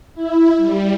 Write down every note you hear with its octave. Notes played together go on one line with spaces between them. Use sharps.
E4
G3